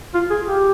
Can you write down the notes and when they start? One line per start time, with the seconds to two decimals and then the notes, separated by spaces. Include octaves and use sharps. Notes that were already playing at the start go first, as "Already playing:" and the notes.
0.15 F4
0.31 G#4
0.46 G4